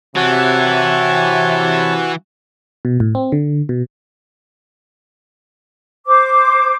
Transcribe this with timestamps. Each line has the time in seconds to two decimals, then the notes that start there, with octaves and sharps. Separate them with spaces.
0.16 C3 E3 F#4 C#5 A5
2.85 B2
3.00 A2
3.15 C4
3.32 D3
3.69 B2
6.06 C5 D6